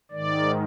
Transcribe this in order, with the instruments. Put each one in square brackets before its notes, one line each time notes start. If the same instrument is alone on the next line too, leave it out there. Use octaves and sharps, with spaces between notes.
[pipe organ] G#2 D#3 D5